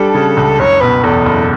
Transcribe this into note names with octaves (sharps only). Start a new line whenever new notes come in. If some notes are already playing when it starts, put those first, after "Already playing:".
Already playing: G3 D4 A4
C#3
C#2
F#1 C#5
B2 B4
E2 A4
F#1